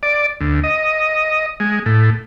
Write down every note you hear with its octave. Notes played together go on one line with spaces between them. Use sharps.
D5
D2
D#5
G#3
A2